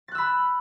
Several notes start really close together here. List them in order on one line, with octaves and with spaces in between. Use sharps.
A6 F#6 E6 B5